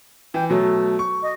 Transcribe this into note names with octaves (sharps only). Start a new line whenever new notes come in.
E3 G5
B2 F#3 A3
C#6
D#5